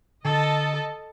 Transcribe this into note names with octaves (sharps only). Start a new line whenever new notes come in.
D3 A4 D#5 A5